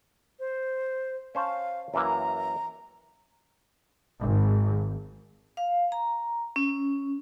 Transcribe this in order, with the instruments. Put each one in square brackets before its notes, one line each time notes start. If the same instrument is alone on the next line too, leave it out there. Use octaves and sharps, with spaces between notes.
[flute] C5
[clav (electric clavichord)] C#4 C5 A5 [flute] F5
[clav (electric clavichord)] F#2 E3 A#3 [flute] A#5
[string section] G#1
[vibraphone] F5
A#5
C#4